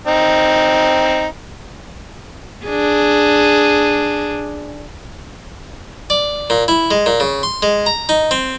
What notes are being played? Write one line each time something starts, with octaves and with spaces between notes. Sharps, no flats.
C4 D#4
D4 G#4
D5
A#2
E4
G#3
A#2
C#3
C6
G#3
A#5
D#4
C4